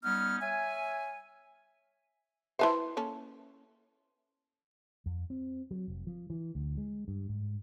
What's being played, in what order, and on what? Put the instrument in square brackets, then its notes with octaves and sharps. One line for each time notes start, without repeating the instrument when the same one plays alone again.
[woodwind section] G3 B3 C#4 D#4 F6
C#5 E5 G#5
[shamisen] E4 B4 C5 [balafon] E5 A5 C6
[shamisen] A#3 C#4 A4
[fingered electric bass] F2
C4
F#3
F1
F3
E3
D2
G#3
G2
G#2